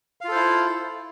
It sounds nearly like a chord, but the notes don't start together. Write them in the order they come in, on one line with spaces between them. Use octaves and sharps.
F5 F4 A4 C5 E4